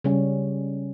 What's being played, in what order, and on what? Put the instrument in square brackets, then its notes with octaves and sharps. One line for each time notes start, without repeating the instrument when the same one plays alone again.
[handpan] C#3 G3 C#4